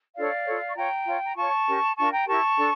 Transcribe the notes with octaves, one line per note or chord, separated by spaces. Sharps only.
D4 F4 A4 C#5 D5 F5
F4 A4 C#5
C#6
F4 C#5 G5 A#5
F4 C#5
A#5
F4 C#5 A5 C#6
C#4 G4 A#4
D4 F4 A#4 A5 C#6
G5 A#5
E4 G4 A#4 A5 C#6
D4 A4